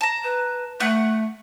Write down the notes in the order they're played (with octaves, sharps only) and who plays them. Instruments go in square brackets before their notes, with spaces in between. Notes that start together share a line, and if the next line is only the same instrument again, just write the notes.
[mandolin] A5 A#5
[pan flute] B4
[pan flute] A3 [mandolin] F#5